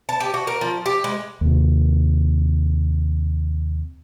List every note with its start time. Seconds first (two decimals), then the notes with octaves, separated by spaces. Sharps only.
0.09 A5
0.20 G4
0.34 F#4
0.47 A#4
0.61 F3
0.86 G4
1.04 G#3
1.41 D#2 C3